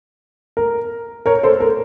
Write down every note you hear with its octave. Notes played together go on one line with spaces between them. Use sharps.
A#4
A#4 C#5
A4 C5
A#4